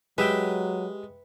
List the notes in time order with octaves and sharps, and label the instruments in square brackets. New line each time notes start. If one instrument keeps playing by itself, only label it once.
[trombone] F#3 [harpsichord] G#3 [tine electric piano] G4 [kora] B4 E5 G5